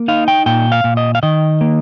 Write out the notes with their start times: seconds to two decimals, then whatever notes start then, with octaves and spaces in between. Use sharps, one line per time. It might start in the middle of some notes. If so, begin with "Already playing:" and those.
Already playing: A#3
0.08 D#4 F5
0.28 G5
0.46 A#2 G5
0.72 F5
0.84 A#2
0.97 D#5
1.15 F5
1.23 D#3 D#5
1.61 A#3